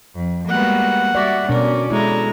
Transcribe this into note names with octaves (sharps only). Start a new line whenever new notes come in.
F2
G3 G#3 A#3 B3 F#4 F#5
G3 F#4 D5 E5
B2 C#4 D4 A#4 D5
G#3 E4 A4 A#5